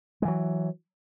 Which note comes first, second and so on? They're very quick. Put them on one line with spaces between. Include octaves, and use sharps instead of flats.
G#3 E3 F#3